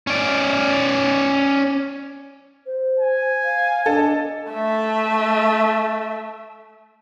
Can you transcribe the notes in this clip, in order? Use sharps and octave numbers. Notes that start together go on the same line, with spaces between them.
C#4 D5
C5
G#5
F5
D4 A4 D#5
A3 E5